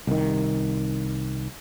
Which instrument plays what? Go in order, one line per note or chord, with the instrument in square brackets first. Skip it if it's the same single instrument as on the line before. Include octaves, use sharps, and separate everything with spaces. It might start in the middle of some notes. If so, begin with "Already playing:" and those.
[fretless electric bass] C2 D#3